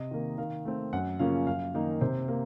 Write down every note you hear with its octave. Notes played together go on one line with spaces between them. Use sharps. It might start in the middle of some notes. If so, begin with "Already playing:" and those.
Already playing: C3 D#5
D#3 A#3
D#3 F5
A3 C4
F#2 F#5
C#3 F3 A#3 C#4 F5
F#2 F5
D#3 A#3 D#4
C3 C5
A#3